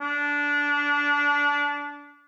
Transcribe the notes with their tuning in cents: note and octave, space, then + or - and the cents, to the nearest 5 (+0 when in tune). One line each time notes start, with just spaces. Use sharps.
D4 -20